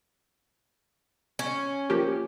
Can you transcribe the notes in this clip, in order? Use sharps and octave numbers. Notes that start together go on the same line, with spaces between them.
C#4
F3 A#3 G4